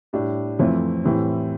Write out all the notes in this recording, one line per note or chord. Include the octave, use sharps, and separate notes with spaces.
A2 G3 D4
F2 E3 A3 C4 F4
A2 E3 G3 C4